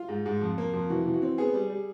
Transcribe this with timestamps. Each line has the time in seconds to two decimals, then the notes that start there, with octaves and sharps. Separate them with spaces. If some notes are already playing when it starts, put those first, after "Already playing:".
Already playing: F4
0.08 G#2
0.26 G#2
0.41 F2
0.58 A#3
0.73 F2
0.90 E3 F#4
1.06 E3
1.14 F#4
1.22 C4
1.38 B3 G#4
1.54 G3
1.70 G3